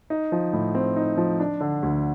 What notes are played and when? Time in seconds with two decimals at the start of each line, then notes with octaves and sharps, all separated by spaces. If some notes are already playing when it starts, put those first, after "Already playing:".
0.10 D#4
0.32 F3
0.53 A2
0.75 C4
0.97 D#4
1.17 F3
1.40 D4
1.61 D3
1.83 D2